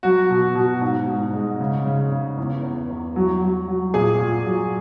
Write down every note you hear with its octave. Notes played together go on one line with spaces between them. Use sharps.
F#3 F#4
B2
B2
G#2
G#2
G#3
C#3
C#3
C#3
E2
E2
E2
F#3
F#3
F#3
A#2 G#4
A#2
F#3